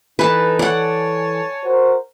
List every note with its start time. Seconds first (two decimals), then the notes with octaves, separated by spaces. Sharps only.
0.19 E3 D#4 A4 B4 A5
0.59 C#5 D5 F#5 G#5 A5
1.63 F#4 A#4 C5